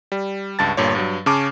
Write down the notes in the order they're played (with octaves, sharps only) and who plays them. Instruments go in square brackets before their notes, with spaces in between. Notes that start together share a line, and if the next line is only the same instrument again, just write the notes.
[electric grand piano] G3
C#2 G2 A5 A6
G1 G2 A#2 C#5
G2 F#3
C#3 C#4 A5 C#6 D6